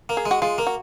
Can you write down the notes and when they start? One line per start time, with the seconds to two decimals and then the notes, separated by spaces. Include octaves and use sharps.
0.09 A#3
0.17 G#4
0.26 G#3
0.31 F#4
0.42 G#3 F4
0.58 A#3
0.67 F#4